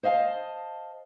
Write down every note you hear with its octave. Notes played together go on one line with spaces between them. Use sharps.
C5 D#5 F5 G#5 A5